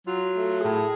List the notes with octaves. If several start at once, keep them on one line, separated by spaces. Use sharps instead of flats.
F#3 F4
A3
A2 G#4